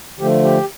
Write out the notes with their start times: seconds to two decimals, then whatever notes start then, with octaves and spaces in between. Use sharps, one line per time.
0.19 D3 F3 A3 G4
0.43 G4